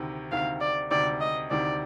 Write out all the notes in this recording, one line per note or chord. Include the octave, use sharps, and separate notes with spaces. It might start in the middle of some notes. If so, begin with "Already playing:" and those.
Already playing: D2 C3 D#3
D2 C3 D#3 F5
D5
D2 C3 D#3 D5
D#5
D2 C3 D#3 D5